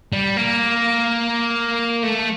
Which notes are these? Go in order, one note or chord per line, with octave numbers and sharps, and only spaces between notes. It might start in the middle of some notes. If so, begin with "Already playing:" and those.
G3
A#3
A3